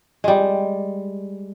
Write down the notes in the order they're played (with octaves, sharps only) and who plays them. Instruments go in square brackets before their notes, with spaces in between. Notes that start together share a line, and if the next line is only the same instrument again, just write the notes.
[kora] G3 G#3